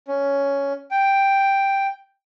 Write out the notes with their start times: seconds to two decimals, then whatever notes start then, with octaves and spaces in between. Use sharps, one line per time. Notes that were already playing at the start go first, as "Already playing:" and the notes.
0.08 C#4
0.91 G5